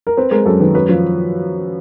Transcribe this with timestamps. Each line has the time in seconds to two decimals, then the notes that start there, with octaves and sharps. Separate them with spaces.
0.07 A#4
0.17 C4 B4
0.31 G#3 A#4
0.46 F#2 A4
0.60 D#3 B4
0.74 F#2 B4
0.89 F3